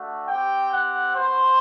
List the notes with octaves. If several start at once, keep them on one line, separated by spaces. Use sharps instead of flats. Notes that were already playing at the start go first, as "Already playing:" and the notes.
Already playing: A3 D4 F#4
C4 G4 G5
F#5
B3 F#4 C5